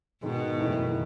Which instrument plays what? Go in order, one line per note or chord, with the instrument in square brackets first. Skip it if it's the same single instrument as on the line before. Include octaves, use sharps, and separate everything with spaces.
[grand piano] G#2 D#3 G#3 D#4 [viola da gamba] B2
[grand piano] F#1 E2 D#3 A3 E4